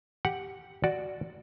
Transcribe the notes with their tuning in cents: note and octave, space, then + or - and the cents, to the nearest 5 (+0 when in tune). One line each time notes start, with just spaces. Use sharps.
G4 +0 F#5 +0
F#4 +0 D5 +0